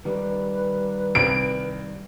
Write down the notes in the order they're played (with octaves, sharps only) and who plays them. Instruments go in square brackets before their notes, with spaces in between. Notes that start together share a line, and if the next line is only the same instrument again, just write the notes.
[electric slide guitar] D#3 G3 [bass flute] B4
[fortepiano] C2 [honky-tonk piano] D7